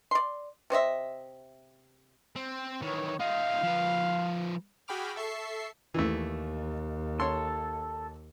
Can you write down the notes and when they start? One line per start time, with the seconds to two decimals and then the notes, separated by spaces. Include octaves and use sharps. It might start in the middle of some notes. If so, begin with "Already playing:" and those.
0.11 D5 C6
0.70 C3 C5 D#5 E5
2.36 C4
2.82 D#3 E3 C#5
3.20 D#4 F4 F5
3.63 F3 B4
4.88 F#4 G#4 G5 B5 D6 F6
5.16 A4 E5 C#6 C7
5.94 D#2 E3 A3
7.20 A4 C#5 C6